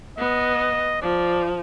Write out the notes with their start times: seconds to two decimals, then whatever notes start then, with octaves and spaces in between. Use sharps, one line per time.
0.18 B3 D#5
1.02 F3 D5